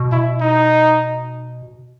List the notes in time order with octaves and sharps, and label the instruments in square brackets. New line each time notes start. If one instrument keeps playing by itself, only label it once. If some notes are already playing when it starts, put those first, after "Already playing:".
Already playing: [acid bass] B2
[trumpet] E4
D#4